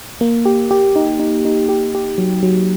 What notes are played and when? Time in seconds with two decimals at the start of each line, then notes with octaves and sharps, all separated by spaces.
0.21 A#3
0.46 G4
0.71 G4
0.96 D#4
1.19 D#4
1.45 D#4
1.69 G4
1.95 G4
2.18 F#3
2.43 F#3